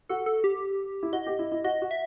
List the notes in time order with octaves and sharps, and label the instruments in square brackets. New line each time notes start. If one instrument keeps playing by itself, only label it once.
[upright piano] F#4 [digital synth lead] A4
[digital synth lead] A4
G4
[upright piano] E4
[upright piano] F#4 [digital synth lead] D#5
[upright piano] G4
E4
E4
[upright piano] F#4 [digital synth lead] D#5
[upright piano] F#4
[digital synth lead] E5